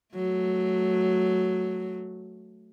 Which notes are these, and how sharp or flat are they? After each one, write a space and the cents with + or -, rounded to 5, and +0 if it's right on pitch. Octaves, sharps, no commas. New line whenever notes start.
F#3 +0 A3 -5